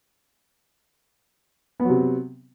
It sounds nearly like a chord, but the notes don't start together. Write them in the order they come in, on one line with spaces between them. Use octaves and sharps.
B3 F#3 C3